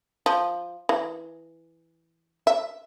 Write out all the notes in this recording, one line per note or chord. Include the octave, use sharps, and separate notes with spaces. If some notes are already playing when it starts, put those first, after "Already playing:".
F3
E3
E5